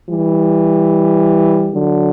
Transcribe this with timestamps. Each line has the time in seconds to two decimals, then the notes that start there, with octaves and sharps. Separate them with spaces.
0.10 E3 G3
1.73 D3 F#3